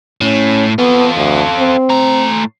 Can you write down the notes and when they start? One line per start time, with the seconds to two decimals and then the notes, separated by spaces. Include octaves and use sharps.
0.21 A2 C#4
0.78 B3 F4 A4
1.17 D2
1.58 C4
1.90 A2 A#5